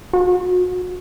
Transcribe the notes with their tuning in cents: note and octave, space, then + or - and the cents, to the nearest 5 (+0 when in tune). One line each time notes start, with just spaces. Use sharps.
F#4 -30